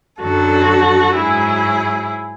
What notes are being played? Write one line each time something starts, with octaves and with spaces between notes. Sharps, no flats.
F#2 D3 F#3 F#4 A4
G#2 F#3 E4 G#4